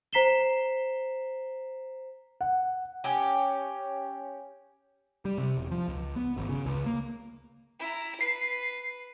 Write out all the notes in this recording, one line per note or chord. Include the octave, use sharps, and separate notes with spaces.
C5 A#5 B6 C7 E7 G7
F#5
C#4 G4
G3
C3
E1
F3
C#2
B3
G#1
C#3
C#2
A#3
E4 A#5
B4 C7